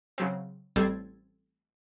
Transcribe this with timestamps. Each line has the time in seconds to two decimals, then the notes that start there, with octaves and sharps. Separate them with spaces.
0.18 C#3 F#3 C4
0.76 A1 G3 C4 A4 G#6 A6